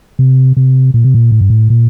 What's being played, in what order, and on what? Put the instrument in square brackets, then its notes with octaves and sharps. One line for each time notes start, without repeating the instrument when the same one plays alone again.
[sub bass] C3
C3
A#2
C3
A#2
A2
G2
A2
A#2